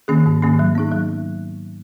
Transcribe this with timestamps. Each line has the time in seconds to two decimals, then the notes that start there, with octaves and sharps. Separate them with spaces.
0.08 D#3 A#3 C#4 G#4
0.26 G#2
0.42 D#3 A#3 C#4 G#4
0.59 F#3
0.75 B3 D#4 G#4
0.92 F#3